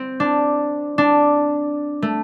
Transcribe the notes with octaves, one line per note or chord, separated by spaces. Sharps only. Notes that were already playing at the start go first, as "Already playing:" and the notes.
Already playing: C4
D4
D4
A3